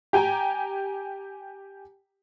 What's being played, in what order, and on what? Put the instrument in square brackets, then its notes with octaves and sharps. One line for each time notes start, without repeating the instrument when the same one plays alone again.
[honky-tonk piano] G4 G5 G#5 A#5